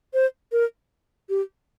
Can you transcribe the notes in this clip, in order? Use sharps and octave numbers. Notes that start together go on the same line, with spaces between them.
C5
A#4
G4